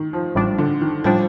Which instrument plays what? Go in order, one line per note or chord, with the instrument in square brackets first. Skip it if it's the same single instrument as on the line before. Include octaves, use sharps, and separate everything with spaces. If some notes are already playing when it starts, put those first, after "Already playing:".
Already playing: [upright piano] D#3
F3
[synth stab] A1 A2 G3 D4 [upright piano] F3
[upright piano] D3
D#3
[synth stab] A2 G3 D4 [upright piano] F3